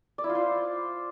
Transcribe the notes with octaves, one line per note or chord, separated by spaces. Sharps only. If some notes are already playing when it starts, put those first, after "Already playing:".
D5
E4
F4
C5